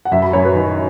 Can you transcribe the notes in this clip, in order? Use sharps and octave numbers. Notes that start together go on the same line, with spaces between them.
F#5
F#2 E5
B5
F#2 C#5
B4
D#3